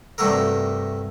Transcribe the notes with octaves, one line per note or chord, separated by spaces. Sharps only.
G2 C3 A3 F#4 A4 A#4